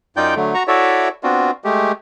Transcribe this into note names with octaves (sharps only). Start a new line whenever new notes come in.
F#2 D#4 F4 D5 G5 G6
D3 F#3 A3
F#4 A#5 C#6
E4 F#4 A4 C#5 D5 E5
B3 C4 D4 F4 F#4
G#3 A3 G4